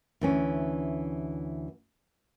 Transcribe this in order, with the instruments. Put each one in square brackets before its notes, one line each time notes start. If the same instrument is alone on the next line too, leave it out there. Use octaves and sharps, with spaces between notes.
[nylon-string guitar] D2 E3 C#4